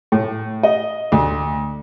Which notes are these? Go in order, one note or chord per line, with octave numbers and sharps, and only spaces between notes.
A2
D#5
D2